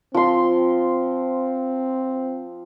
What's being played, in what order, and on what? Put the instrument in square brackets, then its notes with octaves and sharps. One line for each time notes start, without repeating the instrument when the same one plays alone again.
[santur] F3 C6 [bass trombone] C4